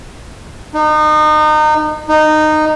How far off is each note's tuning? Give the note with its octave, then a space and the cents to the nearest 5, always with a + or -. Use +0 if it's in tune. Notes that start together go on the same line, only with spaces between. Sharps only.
D#4 -30
D#4 -15